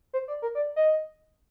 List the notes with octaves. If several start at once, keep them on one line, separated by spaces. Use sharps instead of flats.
C5
D5
A#4
D5
D#5